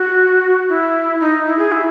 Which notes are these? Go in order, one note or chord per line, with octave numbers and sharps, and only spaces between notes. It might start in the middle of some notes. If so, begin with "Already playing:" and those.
Already playing: F#4
E4
D#4
E4
G#4
E4